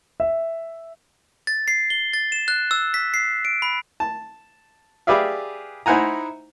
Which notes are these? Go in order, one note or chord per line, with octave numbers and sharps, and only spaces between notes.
E5
A6
C7
G7
A6
E7
F#6
E6
B6
C7
D7
B5
A5
G4 G#4 B4 D5 E5 F5
D#4 E4 C5 F#5 G#5 A#5